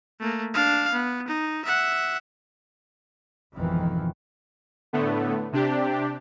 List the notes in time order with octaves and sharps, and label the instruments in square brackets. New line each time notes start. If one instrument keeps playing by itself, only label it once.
[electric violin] A3 A#3
D4 F5
B3
D#4
E5 F#5
[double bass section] G#1 F2 B2 D#3 E3
[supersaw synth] A2 D3 A3 B3
C3 D4 G4